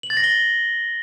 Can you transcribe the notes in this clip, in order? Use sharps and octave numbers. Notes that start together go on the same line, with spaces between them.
F#7
A6
A#6
G7